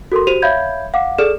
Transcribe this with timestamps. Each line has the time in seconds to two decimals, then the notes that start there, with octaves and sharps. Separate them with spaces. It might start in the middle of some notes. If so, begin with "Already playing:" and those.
0.12 F#4 A4 A#4 C6
0.27 F#4 G4 C5 D#7 F7
0.42 C#5 E5 F5 B5 G6 G#6
0.94 F5 F#5 D6
1.18 G#4 A4 D5 F6 E7